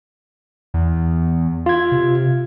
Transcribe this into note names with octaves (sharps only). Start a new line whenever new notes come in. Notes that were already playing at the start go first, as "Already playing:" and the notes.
E2
F4 G#6
C3